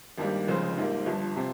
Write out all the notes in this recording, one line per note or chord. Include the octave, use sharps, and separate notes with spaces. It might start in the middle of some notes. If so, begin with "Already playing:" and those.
G#1 G2 D#3 G3 A#3
F1 F2 C#3 G#3 C5
A#1 G#2 G3 A#3
G1 G2 F3
C3 F3 C4